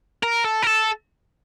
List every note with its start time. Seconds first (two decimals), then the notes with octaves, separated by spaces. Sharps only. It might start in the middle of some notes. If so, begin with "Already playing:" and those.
0.23 A#4
0.45 A4
0.63 A#4
0.67 A4